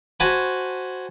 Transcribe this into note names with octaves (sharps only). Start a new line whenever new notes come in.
F#4 C5 G#5 A5 B5